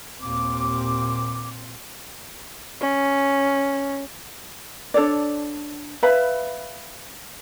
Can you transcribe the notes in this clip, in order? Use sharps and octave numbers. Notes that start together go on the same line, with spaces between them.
D#2 A#2 C4 D6
C#4
D4 A4 C#5 D5
B4 E5 F5 B5